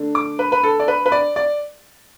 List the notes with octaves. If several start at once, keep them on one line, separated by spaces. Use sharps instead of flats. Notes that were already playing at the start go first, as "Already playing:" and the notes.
Already playing: D3 A3 D4
D6
B4
B4
A4
D5
B4
B4
D5
D5